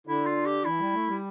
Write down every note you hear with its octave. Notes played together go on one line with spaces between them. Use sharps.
D3 E4
F4
G4
E3 E4
G3
A3
G3